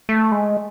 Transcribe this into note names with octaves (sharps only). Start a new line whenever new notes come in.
A3
G#3